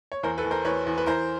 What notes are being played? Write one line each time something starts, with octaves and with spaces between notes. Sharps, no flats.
C#5
E2 A#4 C5
A4 B4
E2
A#4 C5
E2 B4 C#5
E2
B4
E3 A#4 C5